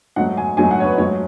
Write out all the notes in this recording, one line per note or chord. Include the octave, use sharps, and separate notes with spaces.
G#2 F#3 A3 F#5
G#5
G#2 F#3 A3 G#5
F#5
C#5
B4
G#2 F#3 A3 C#5